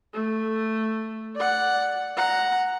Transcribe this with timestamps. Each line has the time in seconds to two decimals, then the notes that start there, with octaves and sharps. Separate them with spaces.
0.14 A3
1.36 D5 F#5
2.17 F#5 A#5